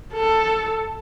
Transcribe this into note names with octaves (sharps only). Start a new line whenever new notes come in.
A4